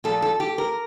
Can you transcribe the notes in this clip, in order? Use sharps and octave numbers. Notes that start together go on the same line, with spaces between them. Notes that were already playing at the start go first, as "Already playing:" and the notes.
A#2 F3 A4
A4
G4
A#4